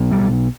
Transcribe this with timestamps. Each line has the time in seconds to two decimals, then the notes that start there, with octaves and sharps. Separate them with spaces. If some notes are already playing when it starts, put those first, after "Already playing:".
Already playing: B1 B2
0.11 G3